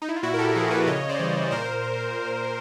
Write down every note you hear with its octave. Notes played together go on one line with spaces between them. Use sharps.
D#4
E4
F4
A#2 E4 F#4
A#4
G4 A4
F3 G#4 A#4
A4 B4
C#3 C#5 D#5
C5 D5
E3 G3
A#2 A#4 C5